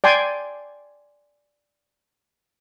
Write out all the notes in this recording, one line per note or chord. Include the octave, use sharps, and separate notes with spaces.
D5 G5 G#5 C6